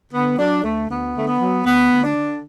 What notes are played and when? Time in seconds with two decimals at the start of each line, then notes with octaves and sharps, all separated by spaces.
0.12 D3 B3
0.38 F#3 D4
0.63 D2 A3
0.89 D2 B3
1.15 D3 A3
1.27 B3
1.40 F#3
1.65 D2 B3
1.91 D2
2.04 D4
2.16 D3